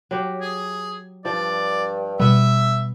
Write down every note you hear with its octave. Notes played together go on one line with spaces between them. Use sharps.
F#3 G4
G#4
G2 F3 D5
B2 G3 B3 E5